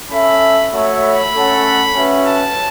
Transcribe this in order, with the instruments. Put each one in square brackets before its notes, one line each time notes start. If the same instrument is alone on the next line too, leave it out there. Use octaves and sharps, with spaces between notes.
[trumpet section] C#4 A4 E5 [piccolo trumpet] B5
[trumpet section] A3 F#4 C#5 E5
[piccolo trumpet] B5
[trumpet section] A3 C#4 A4 F#5
C#4 F#4 B4 E5
[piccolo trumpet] A5